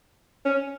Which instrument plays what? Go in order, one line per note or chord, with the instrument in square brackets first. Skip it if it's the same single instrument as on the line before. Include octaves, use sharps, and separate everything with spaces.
[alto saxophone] C#4